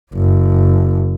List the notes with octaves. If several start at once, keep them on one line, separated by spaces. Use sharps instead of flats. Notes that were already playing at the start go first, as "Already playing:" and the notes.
F#1